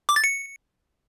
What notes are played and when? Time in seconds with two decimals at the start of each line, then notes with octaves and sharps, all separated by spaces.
0.09 D6
0.16 A6
0.24 C#7